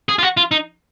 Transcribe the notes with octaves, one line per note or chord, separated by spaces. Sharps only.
G#4
F4
F#4
F4
D#4